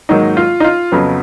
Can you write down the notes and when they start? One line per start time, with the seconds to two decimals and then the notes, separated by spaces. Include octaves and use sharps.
0.09 G#2 D#3 F#3 A#3 D#4
0.37 F4
0.60 D#4
0.64 F4
0.92 F2 C#3 F#3 B3